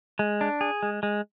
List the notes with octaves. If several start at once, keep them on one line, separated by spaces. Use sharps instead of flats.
G#3
D4
G#4
G#3
G#3